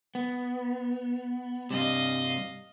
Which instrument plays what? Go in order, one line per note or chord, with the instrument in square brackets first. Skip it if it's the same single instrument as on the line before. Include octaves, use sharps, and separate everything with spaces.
[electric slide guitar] B3
[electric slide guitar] G2 C3 [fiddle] D#5 F5